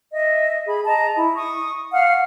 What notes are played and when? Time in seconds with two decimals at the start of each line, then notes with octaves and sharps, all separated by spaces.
0.12 D#5 E5
0.67 G#4 B5
0.86 D#5 A5 A#5
1.15 E4
1.35 C#6 D#6
1.93 F5 F#5 F6